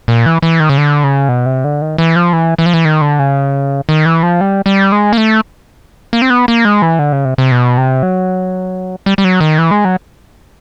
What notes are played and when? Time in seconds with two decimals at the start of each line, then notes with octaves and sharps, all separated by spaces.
0.08 A#2
0.26 E3
0.42 E3
0.60 D#3
0.69 C#3
0.78 D3
1.04 C#3
1.29 B2
1.46 C3
1.64 D3
1.81 D#3
1.98 E3
2.16 F3
2.33 E3
2.58 E3
2.66 F3
2.74 E3
2.85 D#3
3.01 D3
3.19 C#3
3.89 D#3
4.06 E3
4.23 F3
4.41 G3
4.66 G3
4.92 G#3
5.13 A#3
5.18 A3
6.13 A#3
6.22 C4
6.30 B3
6.48 A#3
6.65 G#3
6.82 E3
6.99 D3
7.12 C#3
7.25 C3
7.38 C3
7.52 B2
7.78 C3
8.03 F#3
9.06 G3
9.18 G3
9.24 F#3
9.40 D#3
9.58 E3
9.71 G#3
9.85 F#3